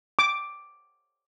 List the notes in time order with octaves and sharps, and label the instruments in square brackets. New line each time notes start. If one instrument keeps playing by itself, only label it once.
[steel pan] D6